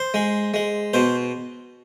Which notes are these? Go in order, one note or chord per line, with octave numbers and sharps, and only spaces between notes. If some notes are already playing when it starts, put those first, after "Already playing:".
Already playing: C5
G#3
G#3
B2 C5